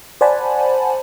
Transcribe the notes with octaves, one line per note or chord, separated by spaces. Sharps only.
C5 D5 F#5 G#5 A5 B5